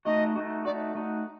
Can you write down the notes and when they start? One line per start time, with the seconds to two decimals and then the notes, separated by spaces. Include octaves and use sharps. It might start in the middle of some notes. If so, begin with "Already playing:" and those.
0.05 A3 D#4 F#4 D#5
0.36 A3 D#4 F#4
0.65 A3 D#4 F#4 D5
0.95 A3 D#4 F#4